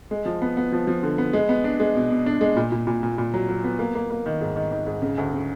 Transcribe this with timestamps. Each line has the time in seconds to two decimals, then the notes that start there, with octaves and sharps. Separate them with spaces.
0.11 G#3
0.25 F3
0.42 B3
0.57 B3
0.72 F3
0.87 F3
1.03 D3
1.18 B3
1.33 G#3
1.49 B3
1.64 D4
1.80 G#3
1.95 B2
2.11 B2
2.26 D4
2.41 G#3
2.57 A#2
2.72 A#2
2.87 A#2
3.03 A#2
3.18 A#2
3.34 F#3
3.49 F#3
3.64 B3
3.79 A#3
3.95 A#3
4.10 A#3
4.26 D#3
4.41 G#2
4.56 D#3
4.72 D#3
4.86 G#2
5.02 C#3
5.18 D2
5.33 C#3